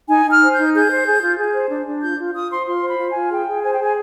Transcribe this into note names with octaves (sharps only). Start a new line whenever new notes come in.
D#4 G#5
D#4
F6
C5
G6
D#4
G#4 G6
C5
G#4
F4
G#4
C5
D4
D4
F4 G6
F4
F4 D#6
C5 C6
F4 C6
C5
B5
F4
F4 G#5
G#4 G5
G#4
C5 G#5
G5
G#4 G#5